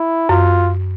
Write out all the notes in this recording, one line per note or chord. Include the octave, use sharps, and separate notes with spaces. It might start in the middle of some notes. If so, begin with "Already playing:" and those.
Already playing: E4
F#2 F4